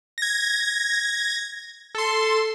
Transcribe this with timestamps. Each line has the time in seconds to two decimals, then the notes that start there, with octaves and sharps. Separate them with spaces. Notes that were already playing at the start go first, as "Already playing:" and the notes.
0.18 G#6 A#6
1.95 A4 C6